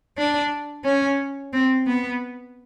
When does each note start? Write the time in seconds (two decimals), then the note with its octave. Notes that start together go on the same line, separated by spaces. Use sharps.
0.18 D4
0.85 C#4
1.53 C4
1.87 B3